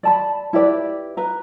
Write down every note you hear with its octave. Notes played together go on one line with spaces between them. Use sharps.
D5 A5 B5
E4 G4 B4 D5
B4 A#5